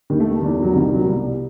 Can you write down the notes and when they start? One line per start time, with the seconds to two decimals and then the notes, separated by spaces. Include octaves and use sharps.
0.10 D#2 D#3 G3
0.20 A3
0.31 G3
0.41 E2 D#3 G3
0.53 G3
0.63 F#3
0.73 C2 C3 D#3 G3
0.84 G3
0.94 F#3
1.06 C2 B2 G3